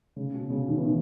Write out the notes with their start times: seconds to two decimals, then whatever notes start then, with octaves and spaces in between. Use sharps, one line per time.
0.16 C#3
0.34 B2
0.50 C#3
0.67 B2 D#3
0.77 E3
0.84 B2 D#3